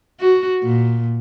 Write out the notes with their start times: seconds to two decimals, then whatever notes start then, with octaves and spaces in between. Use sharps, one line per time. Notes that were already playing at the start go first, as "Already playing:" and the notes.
0.20 F#4
0.63 A#2